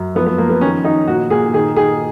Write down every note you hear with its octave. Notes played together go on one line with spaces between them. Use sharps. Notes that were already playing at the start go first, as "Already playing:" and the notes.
Already playing: F#2
F3 B3
B3
F3 A#3
B3
D#3 C#4
D#3 D#4
A#2 F#4
A#2 G#4
D#3 G#4
D#3 G#4